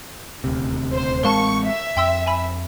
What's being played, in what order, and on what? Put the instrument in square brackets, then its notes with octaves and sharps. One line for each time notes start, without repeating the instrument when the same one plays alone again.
[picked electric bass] D#1 D2 C3
[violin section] C5
[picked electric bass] A1 G#3 C4 [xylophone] A#4 F5 A5 [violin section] C#6
[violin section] E5
[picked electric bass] F2 [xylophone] G5 C6 E6
[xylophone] G#5 B5